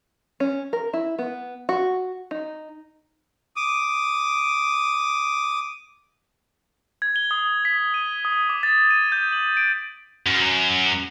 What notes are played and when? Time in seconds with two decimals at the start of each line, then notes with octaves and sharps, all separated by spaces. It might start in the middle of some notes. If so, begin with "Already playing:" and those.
0.40 C#4
0.73 A#4
0.93 E4
1.19 B3
1.69 F#4
2.31 D#4
3.56 D6 D#6
7.02 G#6
7.16 G7
7.31 D#6
7.65 B6
7.94 D#7
8.25 D#6
8.49 D6
8.63 A6
8.91 D#7
9.12 G6
9.33 F#7
9.57 D7
10.26 F#2